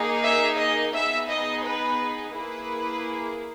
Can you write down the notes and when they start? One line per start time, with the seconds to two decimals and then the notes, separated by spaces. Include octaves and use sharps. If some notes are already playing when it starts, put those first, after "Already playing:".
Already playing: A#3 D#4 G#4
0.23 E5
0.59 D#5
0.94 B3 D#4 G#4 E5
1.30 D#5
1.65 B4
2.35 A#3 E4 G#4 B4